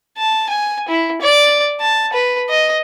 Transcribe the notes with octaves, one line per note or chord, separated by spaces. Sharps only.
A5
G#5
E4
D5
A5
B4
D#5